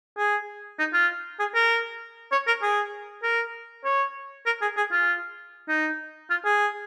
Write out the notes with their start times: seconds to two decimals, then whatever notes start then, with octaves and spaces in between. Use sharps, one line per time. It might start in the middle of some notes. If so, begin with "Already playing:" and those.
0.17 G#4
0.79 D#4
0.93 F4
1.39 G#4
1.54 A#4
2.32 C#5
2.47 A#4
2.62 G#4
3.23 A#4
3.85 C#5
4.46 A#4
4.61 G#4
4.77 G#4
4.92 F4
5.68 D#4
6.30 F4
6.45 G#4